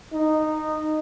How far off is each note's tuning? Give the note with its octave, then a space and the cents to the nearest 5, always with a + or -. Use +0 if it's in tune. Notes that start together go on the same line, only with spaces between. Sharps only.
D#4 -15